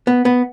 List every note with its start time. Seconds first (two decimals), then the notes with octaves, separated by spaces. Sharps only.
0.07 B3
0.25 B3